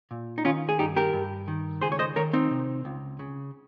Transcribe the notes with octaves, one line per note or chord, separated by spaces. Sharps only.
A#2
D#4
D#3 C#4 F4
G#4
G2 D#4 G4
G4 A#4
G2
D#3
C#2 G#4 C5
C#5
C5 D#5
D#3 A#4 C#5
C4 D#4
C3
C#2
C#3